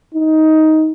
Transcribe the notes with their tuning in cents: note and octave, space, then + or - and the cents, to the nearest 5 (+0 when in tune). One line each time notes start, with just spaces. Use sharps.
D#4 +10